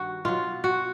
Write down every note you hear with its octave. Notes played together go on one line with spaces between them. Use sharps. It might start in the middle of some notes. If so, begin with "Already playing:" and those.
Already playing: G2 D#3 F#4
B2 F#3 F4
F#4